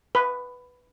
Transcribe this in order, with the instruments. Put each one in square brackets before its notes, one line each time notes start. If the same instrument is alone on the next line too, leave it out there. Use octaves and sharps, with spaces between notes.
[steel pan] B4